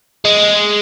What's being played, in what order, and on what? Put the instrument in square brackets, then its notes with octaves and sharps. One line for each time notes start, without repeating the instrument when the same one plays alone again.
[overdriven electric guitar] G#3